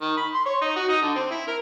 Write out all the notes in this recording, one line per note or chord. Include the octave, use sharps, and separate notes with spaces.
D#3
B5
C6
C#5
D#4
F#4
D#4
D3
C4
E4
A#4